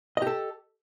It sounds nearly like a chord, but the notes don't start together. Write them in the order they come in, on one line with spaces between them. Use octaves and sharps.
D#5 G4 A4